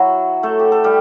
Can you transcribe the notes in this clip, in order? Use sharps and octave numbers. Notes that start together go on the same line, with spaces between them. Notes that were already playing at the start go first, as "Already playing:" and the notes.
Already playing: F#3 E4 F#4
A3 A4
G4
A4
G3 G4